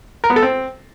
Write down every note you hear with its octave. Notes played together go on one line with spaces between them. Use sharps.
A#4
B3
A4
C4